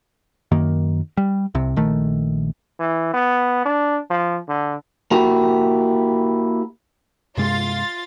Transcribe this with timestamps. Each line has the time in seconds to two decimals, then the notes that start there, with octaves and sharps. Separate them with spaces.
0.52 F#2 D#3 A#3
1.17 G3
1.55 C2 C3
1.76 A#1 D#3 A3
2.79 E3
3.14 B3
3.65 D4
4.11 F3
4.49 D3
5.11 A#3 E4 F#4 G4
7.37 G2 C3 G#3 F4 F5 A6